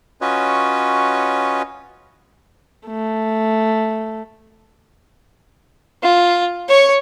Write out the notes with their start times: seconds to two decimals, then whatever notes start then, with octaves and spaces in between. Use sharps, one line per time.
0.21 C#4 F4 F#4 B4 C#5 D#5
2.87 A3
6.03 F4
6.68 C#5 C#6